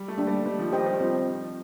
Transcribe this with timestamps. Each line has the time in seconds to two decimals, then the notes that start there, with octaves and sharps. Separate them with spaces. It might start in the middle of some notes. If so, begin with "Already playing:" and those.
Already playing: G3
0.08 A3
0.18 A#3 D4 G4
0.27 G3
0.46 G3 D#4
0.59 F3
0.72 D#3 G4 C5 D#5 G5
0.86 G3
1.01 F3 C4